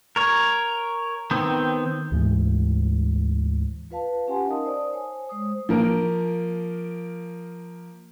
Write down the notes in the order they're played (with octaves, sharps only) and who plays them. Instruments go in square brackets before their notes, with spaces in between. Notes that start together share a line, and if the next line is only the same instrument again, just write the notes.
[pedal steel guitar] A#4 C#5
D#3 B3 C4
[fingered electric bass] D2 G#2 E3 G#3
[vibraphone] F4 B4 F5 A5
C#4 G4 F#5 G#5 A5 C6
D#4 A#4 D#5 F5 A5 D#6
C5 D5 D#6
C5 C#5 G#5
G#3 C5 D#6
[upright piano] F3 A#3 A#4